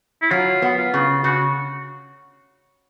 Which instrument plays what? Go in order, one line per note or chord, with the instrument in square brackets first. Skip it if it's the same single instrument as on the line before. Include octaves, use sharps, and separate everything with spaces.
[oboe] E4
[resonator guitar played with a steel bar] F#3 [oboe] F4
[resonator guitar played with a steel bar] B3
[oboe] F4
[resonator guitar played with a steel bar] C#3
[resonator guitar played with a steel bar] C#3 [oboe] F#4